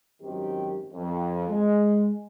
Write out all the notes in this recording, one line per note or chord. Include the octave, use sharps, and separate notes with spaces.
G#1 F#2 D#3 C4 G4
F2
G#3